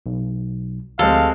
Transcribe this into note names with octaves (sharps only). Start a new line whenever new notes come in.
B1
D2 F3 G3 G#3 C4 A4 F5